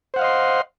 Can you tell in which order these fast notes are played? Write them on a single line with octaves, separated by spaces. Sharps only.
C5 F#5 F5 D#5 C6